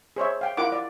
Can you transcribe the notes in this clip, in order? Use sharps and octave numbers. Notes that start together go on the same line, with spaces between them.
G#4 C5 C#5 E5
F5 G5
E4 F4 A#4 F#5 D6
D5